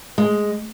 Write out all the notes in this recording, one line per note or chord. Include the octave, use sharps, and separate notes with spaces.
G#3